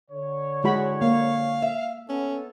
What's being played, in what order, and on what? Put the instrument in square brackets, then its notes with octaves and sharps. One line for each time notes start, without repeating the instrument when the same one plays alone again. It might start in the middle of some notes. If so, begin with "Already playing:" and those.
[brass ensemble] D3 C#5
[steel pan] G#3 F#4 B5 [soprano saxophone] E4
[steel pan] A#3 [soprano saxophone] F5
[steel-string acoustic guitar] E5
[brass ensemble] B3 A4 [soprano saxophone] C#4